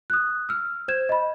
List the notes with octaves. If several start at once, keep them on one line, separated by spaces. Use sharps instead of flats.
D#6 F#6
E6 F6
C5 G6 G#6 E7
D#5 B5